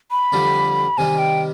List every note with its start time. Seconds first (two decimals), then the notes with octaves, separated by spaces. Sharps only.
0.11 B5
0.32 F2 D3 G3 D4
0.98 C3 D#3 G3 G#5
1.19 G5